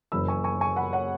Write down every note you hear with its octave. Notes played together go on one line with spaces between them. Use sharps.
F#1 F#2 E3 B5 E6
G#5 C#6
G#5 C#6
G#5 C#6
F#5 B5
C#5 F#5